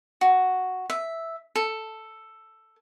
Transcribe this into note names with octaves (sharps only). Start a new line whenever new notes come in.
F#4
E5
A4